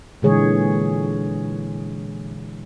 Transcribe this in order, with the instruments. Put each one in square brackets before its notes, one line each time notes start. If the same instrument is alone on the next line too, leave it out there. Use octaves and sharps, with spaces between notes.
[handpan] A#2 D3 E3 G#3 G#4 C#5